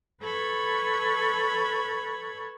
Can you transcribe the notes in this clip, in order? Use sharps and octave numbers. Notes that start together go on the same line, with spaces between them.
A4 B4 C#5 B5 G#6